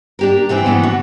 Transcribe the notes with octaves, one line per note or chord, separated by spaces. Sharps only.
D4 G4 A#4
C3 E3 C4 G5
A2 D3 E3 B3
F#4